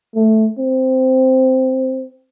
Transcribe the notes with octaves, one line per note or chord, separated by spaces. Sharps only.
A3
C4